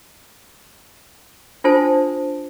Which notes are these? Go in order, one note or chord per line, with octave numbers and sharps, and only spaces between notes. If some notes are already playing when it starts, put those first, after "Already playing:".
D4 F4 A4 C5 G#5 A5